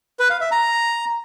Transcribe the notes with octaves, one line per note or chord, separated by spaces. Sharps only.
B4
F5
E5
A#5